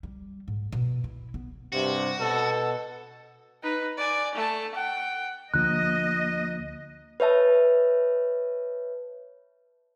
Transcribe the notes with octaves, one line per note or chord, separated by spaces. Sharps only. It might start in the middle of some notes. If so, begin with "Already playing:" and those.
G3
G#2
B2
E4
B3
G2 C3 F#4
B2 A4
D#4 B4
D5 G#5
A3 A5
F#5 G5
D2 D3 F3 A#3 D#5 F#6
B4 C#5 E5 A5